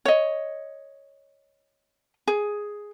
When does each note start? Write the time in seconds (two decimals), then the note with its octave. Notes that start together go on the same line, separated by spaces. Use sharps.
0.05 C#5 D#5
2.28 G#4